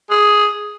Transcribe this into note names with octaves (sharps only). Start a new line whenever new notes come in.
G#4